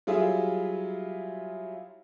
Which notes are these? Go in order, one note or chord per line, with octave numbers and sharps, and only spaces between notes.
F#3 G3 E4 F4 G#4 E5